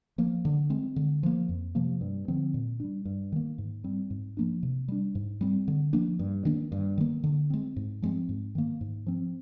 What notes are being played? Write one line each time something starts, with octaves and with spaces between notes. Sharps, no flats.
F3 A#3
D3
G#3 C4
D3
F3 A#3
F2
C3 F3 A#3
G2
D3 F3 C4
A#2
G3 D4
G2
D#3 A#3
G#2
G3 C4
G#2
F3 A#3 D4
C3
G3 D4
G#2
G3 C4
D3
F3 A#3 D4
G2
D#3 A#3 D4
G2
D#3 A#3
D3
G#3 C4
G#2
F3 G#3 C4
G#2
D#3 A#3
G#2
F3 C4